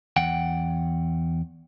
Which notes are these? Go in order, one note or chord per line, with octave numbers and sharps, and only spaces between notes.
E2 F#5 G5